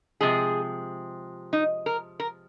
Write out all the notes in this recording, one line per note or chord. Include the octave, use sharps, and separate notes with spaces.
C3 F3 G#3 G#4
D#4
A#4
A#4